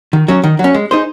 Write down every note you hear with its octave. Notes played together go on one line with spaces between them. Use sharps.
D#3
F#3 C#4
D#3
F#3 C#4
G#3
D#4 G#4 C5